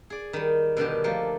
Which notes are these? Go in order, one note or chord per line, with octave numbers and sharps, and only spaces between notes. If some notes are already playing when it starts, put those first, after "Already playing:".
G#4 D5
D#3 G3
B2 D3 D#3 G4
F3 A3 A#3 G4